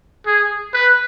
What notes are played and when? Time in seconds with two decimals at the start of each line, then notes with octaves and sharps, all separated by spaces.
0.26 G#4
0.74 B4